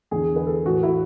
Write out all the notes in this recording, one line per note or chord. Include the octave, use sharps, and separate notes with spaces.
E2 D3 G#4
B4
A4
A2 E3 F#4
E4